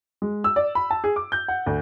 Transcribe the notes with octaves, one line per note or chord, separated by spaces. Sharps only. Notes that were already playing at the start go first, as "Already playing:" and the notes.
G#3
E6
D5
B5
A5
G#4
D6
G6
F#5
D2